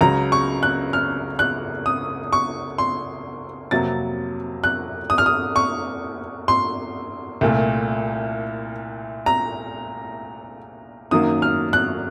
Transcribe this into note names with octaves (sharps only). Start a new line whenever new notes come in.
C#2 C#3 F#3 A#5
C#6
F#6
F6
F#6
D#6
C#6
C6
F2 C3 F#3 A#3 A6
F#6
D#6
F6
D#6
C#6
C6
C2 A#2 A3
A#5
F#2 D#3 F#3 A#3 D#6
F6
F#6